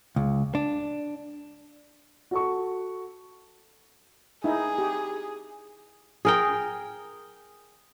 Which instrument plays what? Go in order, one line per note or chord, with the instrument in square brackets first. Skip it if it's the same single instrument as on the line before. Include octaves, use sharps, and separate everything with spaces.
[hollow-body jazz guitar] C#2
D4
[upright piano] F#4 A4 C#6
[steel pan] D#4 E4 [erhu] G#4
[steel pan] G4
[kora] G#4 A#4 G5